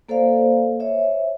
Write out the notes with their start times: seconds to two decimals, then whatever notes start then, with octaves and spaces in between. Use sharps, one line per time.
0.09 A#3 A4 C5 D5 F5
0.80 C5 C#5 E5